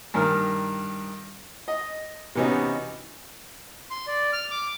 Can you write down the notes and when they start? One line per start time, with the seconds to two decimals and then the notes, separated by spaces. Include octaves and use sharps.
0.14 G2 D#3 A#4 F6
1.68 D#5
2.35 C3 E3 B3 C#4 D#4 F#4
3.91 C6
4.07 D5
4.33 F6
4.51 D6